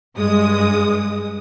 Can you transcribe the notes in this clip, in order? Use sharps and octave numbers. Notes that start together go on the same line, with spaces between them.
G2 G#3 D#6